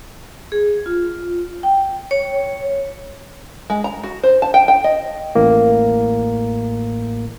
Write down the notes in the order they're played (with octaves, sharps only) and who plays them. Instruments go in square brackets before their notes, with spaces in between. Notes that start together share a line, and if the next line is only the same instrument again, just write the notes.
[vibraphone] G#4
F4
G5
C#5
[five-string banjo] G#3
A#5
F#4
C5
A5
G5
G5
D#5
[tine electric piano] A1 A2 A#3